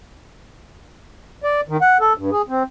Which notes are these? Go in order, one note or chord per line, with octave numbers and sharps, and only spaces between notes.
D5
D#3
F#5
A4
G2
G#4
C4